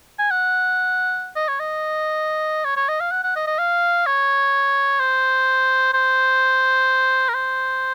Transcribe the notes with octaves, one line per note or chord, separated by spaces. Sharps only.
G#5
F#5
D#5
C#5
D#5
C#5
C#5
D#5
F5
F#5
F#5
D#5
D#5
F5
C#5
C5
C5
A#4
C5